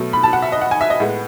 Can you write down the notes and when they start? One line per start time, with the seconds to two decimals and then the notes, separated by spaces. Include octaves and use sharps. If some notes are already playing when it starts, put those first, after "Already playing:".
Already playing: B2 F#3 A3
0.13 B5
0.23 A5
0.33 F#5
0.42 E5
0.52 D#5
0.61 F#5
0.71 G#5
0.81 E5
0.90 D#5
1.00 A2 G#3 B3